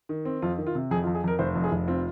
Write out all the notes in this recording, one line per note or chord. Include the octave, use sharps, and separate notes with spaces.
D#3
C4
F2 F4
D#3
F4
C3
F2 G#4
F4
F2
G#4
F2 A#4
F1 C5
F2
G#4
F1
C4 F4